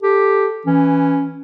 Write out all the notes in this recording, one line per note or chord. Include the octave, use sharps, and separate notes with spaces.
G4 A4
E3 C#4